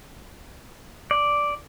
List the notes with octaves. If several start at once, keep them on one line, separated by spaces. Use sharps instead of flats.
D5